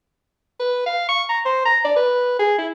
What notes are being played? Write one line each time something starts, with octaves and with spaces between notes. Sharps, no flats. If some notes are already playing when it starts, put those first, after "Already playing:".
B4
F5
C#6
A#5
C5
A#5
D5
B4
G#4
E4